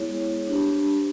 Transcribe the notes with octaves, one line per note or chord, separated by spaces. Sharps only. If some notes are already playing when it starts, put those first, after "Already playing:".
Already playing: G#3 B3 E4 G#4 C#5
D4 G4 C5